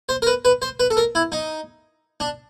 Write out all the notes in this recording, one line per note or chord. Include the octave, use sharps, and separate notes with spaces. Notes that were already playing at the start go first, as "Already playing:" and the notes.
C5
A#4
B4
B4
C5
B4
A4
A#4
E4
D#4
D4